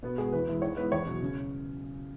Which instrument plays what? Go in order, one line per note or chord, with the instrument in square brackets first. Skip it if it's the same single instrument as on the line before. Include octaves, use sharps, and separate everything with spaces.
[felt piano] B2 [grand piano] B3
[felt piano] G#3 B3 F#4 [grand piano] G#4
[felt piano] E2 [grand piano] B4
[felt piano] E3 G#3 E4
[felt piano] G#2 [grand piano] C#5
[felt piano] G#3 B3 E4 [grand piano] B4
[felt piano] E2 [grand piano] C#5
[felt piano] B2 F#3
C#3